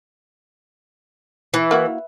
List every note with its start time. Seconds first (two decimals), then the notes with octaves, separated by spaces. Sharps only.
1.54 E3
1.71 A#3 E4 F#4